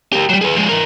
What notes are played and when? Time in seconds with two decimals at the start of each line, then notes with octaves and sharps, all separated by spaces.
0.13 G4 A#4
0.29 F#3 G3
0.41 G#4 B4
0.56 F3 G#3
0.69 E3 A#4